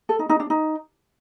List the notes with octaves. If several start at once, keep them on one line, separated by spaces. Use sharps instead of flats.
A4
D#4
D#4
D4
D#4